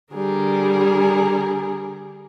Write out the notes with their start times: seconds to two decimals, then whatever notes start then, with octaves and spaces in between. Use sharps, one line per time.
0.13 D3 G3 G#4 A#4